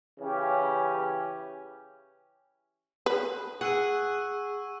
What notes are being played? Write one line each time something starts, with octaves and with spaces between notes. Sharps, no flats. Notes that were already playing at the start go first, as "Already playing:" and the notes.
C#3 E3 C#4 G4
B4
G#4 F#5 C#6 E6 D#7